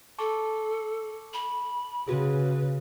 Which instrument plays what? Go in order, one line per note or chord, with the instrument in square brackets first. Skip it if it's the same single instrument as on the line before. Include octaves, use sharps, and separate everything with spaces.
[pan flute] A4 [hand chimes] A5 C#6 D6
[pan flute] B5
[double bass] C#3 [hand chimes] F#4 G#4 [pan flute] B4